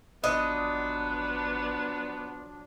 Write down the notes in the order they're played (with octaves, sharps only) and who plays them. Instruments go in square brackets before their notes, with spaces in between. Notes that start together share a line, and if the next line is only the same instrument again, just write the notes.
[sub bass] G#1 [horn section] F3 F#3 D4 [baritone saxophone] B3 [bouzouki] D#5